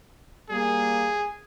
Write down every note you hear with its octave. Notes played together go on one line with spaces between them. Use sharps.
G3 A#3 G#4